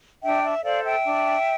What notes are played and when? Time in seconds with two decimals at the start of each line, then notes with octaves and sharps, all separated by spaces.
0.23 D4 E5 G5
0.43 E5
0.63 A4 C5 D5 F5
0.84 E5 G5
1.04 D4